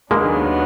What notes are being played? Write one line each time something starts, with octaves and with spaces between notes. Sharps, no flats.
D#2 D#3 F#3 G#3 A#3 B3 D4